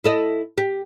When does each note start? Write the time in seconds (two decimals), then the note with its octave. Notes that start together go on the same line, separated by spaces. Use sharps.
0.04 E4 A4 D#5
0.58 G4